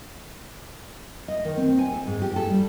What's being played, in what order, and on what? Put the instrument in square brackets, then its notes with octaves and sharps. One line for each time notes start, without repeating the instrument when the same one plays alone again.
[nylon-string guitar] D#5
D#3
C4
G#5
A4
G#2
G4
A4
G3